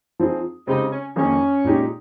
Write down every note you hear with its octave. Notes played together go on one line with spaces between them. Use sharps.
F3 C4 D#4 G#4
C#3 G#3 C4 D#4 G4
C#4
F2 D#3 A#3 C#4 D#4 G#4
A#2 G#3 D#4 G4